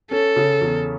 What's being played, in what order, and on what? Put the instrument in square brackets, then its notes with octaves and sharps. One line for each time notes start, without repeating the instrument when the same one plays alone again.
[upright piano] C#4 [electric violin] A4
[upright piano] C#3
E2